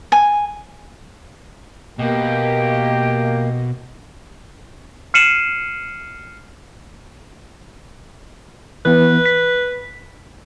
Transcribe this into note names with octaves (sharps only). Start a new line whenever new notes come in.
G#5
B2 A#3 G4 D#5 G5
F6 C7 C#7 D#7 E7 F#7
E3 B3 B4
B6